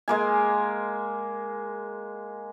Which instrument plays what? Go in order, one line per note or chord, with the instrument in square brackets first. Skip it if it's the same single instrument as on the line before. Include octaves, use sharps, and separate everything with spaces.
[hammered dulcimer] G#3 A#3 G#5